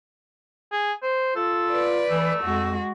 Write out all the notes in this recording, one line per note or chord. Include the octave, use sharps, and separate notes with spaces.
G#4
C5
F4 A4
B4 D5
E3 A3
F2 G#3 F#4